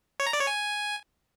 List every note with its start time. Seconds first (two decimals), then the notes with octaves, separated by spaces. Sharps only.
0.20 C#5
0.26 A#5
0.33 D5
0.40 C#5
0.47 G#5